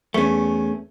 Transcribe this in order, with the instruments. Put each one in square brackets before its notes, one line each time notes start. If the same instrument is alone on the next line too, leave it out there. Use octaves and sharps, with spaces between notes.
[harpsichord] E2 [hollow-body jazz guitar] A3 C#4